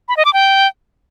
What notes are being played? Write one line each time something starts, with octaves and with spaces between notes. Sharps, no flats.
B5
D#5
D6
G5